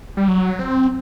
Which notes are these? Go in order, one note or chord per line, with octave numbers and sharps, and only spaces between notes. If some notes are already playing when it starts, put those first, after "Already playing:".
G3
F#3
C4